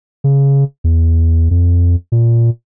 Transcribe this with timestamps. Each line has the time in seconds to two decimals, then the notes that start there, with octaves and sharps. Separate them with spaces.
0.24 C#3
0.84 E2
1.51 F2
2.12 A#2